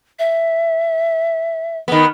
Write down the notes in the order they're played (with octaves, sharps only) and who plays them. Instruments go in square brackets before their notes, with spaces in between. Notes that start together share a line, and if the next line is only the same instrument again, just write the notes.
[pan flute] E5
[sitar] D#3 B3